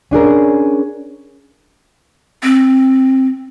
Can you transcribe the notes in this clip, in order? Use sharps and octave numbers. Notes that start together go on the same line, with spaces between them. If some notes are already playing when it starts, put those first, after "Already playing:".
C#4 D4 G#4 A#4
C4